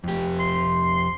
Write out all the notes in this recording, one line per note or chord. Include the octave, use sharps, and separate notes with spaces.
F2 G4
C6